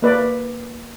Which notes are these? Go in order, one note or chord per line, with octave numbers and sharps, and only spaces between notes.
A#3 B4 D5